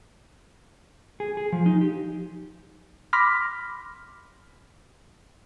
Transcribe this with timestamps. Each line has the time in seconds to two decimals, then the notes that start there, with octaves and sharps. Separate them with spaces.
1.20 G#4
1.37 G#4
1.52 F3
1.66 D#4
1.81 G4
3.13 B5 C6 D6 F6 A#6 B6